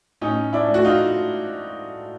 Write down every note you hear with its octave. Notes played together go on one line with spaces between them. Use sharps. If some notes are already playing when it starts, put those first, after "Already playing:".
A2 C#4 D#4
D4 E4
A3
F#4
D#4 F4